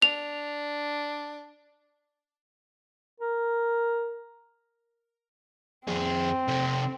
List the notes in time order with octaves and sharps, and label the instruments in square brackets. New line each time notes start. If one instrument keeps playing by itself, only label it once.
[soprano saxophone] D4 [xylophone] F7
[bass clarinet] A#4
[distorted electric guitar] F2 G#4 [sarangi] C4
[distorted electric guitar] C3 A4